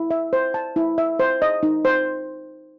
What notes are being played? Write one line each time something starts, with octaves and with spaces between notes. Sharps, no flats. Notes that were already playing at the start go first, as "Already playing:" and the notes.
Already playing: E4
E5
C5
A5
E4
E5
C5
D#5
D#4
C5